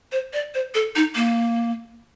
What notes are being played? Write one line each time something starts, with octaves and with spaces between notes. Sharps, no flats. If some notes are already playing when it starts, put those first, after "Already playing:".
C5
D5
C5
A4
D#4
A#3